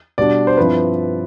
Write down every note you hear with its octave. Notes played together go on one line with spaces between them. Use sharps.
B2 G3 D4 D5
C5
G2 F3 C4 E4 B4